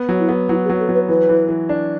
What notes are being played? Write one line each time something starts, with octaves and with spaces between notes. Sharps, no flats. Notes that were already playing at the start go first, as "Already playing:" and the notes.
Already playing: B3
F#3
E4
B3
F#3 E4
G#4
F#3
A4
F#3
B4
E3 B4
E3
E3
D4